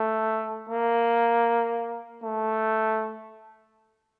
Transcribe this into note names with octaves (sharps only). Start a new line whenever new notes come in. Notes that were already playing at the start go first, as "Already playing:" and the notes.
Already playing: A3
A#3
A3